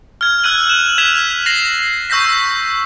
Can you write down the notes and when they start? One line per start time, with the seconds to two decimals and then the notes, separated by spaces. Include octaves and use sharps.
0.21 F6 G#6
0.43 E6 F#6 G#6 D#7 F#7
0.70 E7 F#7
0.98 F6 G#6 B6 E7 F7
1.46 A#6 C7 F7 F#7
2.10 C#6 E6 G6 A#6 B6